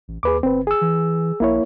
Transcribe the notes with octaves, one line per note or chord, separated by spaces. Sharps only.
A1
D#2 G#4 B4 D6
G1 C4 B4
G#4 E6
E3
A#1 A#3 E4 C#5